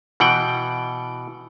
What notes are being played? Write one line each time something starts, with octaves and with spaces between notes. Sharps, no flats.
B2 E3 F#5 G5